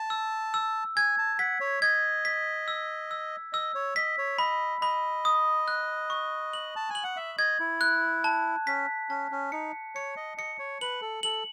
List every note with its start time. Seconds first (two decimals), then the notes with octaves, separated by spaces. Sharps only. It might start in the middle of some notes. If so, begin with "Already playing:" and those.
Already playing: A5
0.10 E6
0.54 E6
0.96 G#5 G#6
1.18 A5
1.39 F#5 B6
1.60 C#5
1.82 D#5 G#6
2.25 B6
2.68 E6
3.11 E6
3.53 D#5 E6
3.75 C#5
3.96 D#5 B6
4.18 C#5
4.39 D#5 B5
4.82 D#5 B5
5.25 D#6
5.68 F#6
6.10 C#6
6.53 F#7
6.76 A5
6.90 G#5
6.95 F#7
7.04 F#5
7.17 E5
7.38 D#5 G#6
7.60 E4
7.81 F#6
8.24 A5
8.67 C#4 B6
9.10 C#4 A5
9.31 C#4
9.52 D#4 C#7
9.95 C#5 C#7
10.17 D#5
10.38 D#5 C#7
10.59 C#5
10.81 B4 F#7
11.02 A4
11.23 A4 F#7